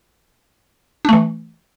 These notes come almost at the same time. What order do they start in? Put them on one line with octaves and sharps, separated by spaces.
D4 A3 E3